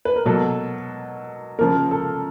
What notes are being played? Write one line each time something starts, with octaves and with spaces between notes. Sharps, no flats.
B4
A#4
B2 F#3 A#3 A4
C#3 F3 A#3 A#4
A4